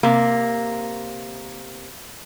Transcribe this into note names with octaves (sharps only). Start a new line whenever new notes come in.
C3 A#3